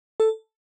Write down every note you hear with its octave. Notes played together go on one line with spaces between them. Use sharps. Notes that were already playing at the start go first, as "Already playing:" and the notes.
A4